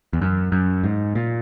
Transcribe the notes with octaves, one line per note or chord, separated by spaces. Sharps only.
E2
F#2
F#2
G#2
A#2